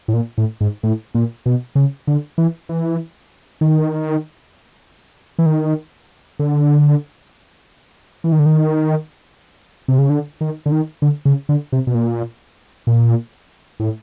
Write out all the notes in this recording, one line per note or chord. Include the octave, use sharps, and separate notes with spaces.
A2
A#2
A2
G#2
A2
A#2
B2
C#3
D3
E3
E3
D#3
E3
D#3
D3
E3
D#3
D3
D#3
C3
C#3
D3
D#3
D3
D#3
D3
C#3
D3
C3
B2
A#2
A#2
A2